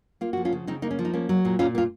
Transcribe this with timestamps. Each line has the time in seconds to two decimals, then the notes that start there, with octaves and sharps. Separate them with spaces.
0.21 A#3 F4
0.33 F3 F#4
0.45 C#4 F4
0.53 C#3
0.67 C#3 C4 D#4
0.82 A#3 D#4
0.91 C#4
0.99 F3
1.05 D#4
1.14 A#3 C#4
1.29 F#3
1.45 A#2
1.59 A#2 C#4 F4
1.75 A#3
1.78 F4